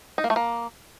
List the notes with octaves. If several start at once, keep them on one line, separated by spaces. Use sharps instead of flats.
D#4
A#3
A3
A#3